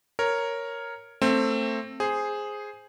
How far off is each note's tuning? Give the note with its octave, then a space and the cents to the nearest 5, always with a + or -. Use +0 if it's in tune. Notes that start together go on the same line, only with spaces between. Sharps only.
A#4 +0 C#5 +0
A3 +25 C4 +15
G#4 +0 C5 +0